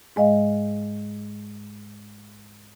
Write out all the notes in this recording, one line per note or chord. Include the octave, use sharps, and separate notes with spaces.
G#2 G#3 D#5 F5